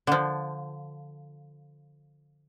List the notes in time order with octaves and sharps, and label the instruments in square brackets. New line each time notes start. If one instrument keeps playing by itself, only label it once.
[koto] D3 F3